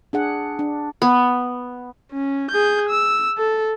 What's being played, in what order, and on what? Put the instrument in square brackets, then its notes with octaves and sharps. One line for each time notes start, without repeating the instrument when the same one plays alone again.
[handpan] D4 G#4 F#5
D4
[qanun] B3
[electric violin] C#4
G#4 G6
E6
A4